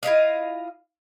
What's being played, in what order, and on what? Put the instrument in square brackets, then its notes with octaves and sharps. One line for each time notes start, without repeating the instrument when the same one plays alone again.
[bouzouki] E4 F4 D#5 F5